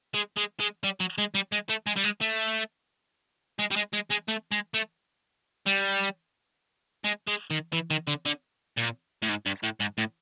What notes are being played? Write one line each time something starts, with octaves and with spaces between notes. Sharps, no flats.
G#3
G#3
G#3
G3
F#3
G#3
G3
G#3
A3
G#3
G3
G#3
A3
G#3
G3
G#3
G#3
G#3
A3
G#3
A3
G3
G#3
G#3
D#3
E3
D#3
D3
D3
A#2
A2
G#2
G2
A2
G#2
A2